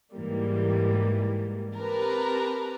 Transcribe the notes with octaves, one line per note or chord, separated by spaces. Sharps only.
G#2 E3 G3 A#3
C4 G4 A#4 B4 A5 A#5